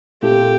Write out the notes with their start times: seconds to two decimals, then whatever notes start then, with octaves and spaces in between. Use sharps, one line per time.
0.22 A#2 A3 C4 F4 G4 A4